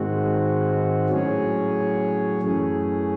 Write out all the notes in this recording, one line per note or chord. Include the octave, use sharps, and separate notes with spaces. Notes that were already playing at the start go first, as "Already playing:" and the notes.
Already playing: G#2 D#3 G#3 C4 F#4
A2 F#3 C#4 G#4 C#5
F#2 E3 A3 C#4 G#4